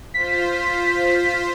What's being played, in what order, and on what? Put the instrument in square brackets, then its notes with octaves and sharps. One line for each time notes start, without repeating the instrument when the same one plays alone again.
[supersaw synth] F4 C5 [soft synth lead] B6